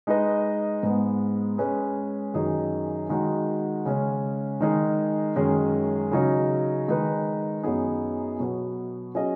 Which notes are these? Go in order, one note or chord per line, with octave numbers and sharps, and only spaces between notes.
G#3 D#4 B4 D#5
G#2 G#3 B3
G#3 C#4 G#4 B4
F#2 D#3 F#3 D#4 G#4
D#3 G#3 D#4 F#4
C#3 G#3 C#4
D#3 G#3 D#4 G#4
F#2 D#3 G#3 C#4 G#4
C#3 F#3 D#4
D#3 G#3 D#4 B4
F#2 F#3 B3 D#4 G#4
B2 F#3 B3
F#3 C#4 G#4 D#5